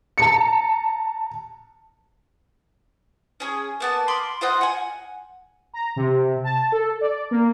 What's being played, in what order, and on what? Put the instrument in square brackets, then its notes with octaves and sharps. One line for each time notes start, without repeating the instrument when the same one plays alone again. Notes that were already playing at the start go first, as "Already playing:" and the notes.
[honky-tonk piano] A5 A#5 C#7
[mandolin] C#4 G#4
A#3 B3 A5
B5 C6 D6 F6
F4 C5 D#5 F#5
F#5 G#5
[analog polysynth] A#5
C3
A5
A4
D5
A#3